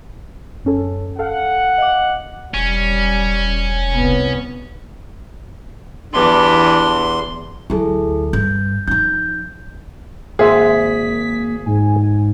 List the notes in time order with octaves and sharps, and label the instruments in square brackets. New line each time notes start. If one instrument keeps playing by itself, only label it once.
[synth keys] F#2 C#4 A4
[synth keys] A4 F5 [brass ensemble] F#5
[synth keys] D#5 F5 D6
[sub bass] E1 [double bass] G3 [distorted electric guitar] C#4
[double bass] C2 B3
[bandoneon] E2 C6 [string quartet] E3 G3 B3 [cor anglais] D4
[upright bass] D2 F#3 [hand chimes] E4 G#4 A4
[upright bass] G2 [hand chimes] G6
[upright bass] F3 D#4 [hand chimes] G6
[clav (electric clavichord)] G#1 C5 E5 [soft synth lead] A#3 [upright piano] G#4 [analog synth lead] B6
[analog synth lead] G#2 [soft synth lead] G#5